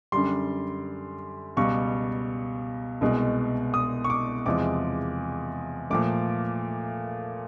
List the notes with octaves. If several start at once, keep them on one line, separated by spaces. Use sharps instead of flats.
F#2 D3 G3 C6
C#2 B2 G3 C#6
C2 B2 G#3
D#6
C#6
D6
E2 C3 F3 G#3 D6
A#2 F3 A3 D6